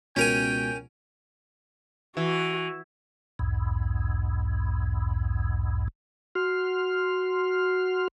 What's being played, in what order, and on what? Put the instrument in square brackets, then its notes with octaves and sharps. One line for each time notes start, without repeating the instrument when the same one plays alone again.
[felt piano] C#2 B2 [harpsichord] C#4 A#4 G#5 [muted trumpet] G5
[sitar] E3 [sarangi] F#4
[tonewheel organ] B1 E2 G#2
F#4 C6 F6